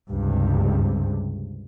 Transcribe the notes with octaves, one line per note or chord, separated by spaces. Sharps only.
C#2 G2 C3